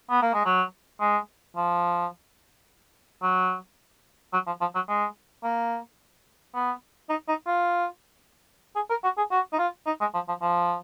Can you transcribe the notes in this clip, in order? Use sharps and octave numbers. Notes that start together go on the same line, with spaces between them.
B3
A#3
G#3
F#3
G#3
F3
F#3
F#3
F3
F3
F#3
G#3
A#3
B3
D#4
D#4
F4
G#4
A#4
F#4
G#4
F#4
D#4
F4
D#4
G#3
F3
F3
F3